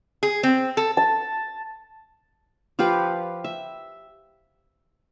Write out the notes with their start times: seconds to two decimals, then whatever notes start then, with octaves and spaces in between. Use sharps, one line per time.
0.23 G#4
0.43 C4
0.77 A4
0.97 A5
2.79 F3 F4 G4 B4
3.44 E5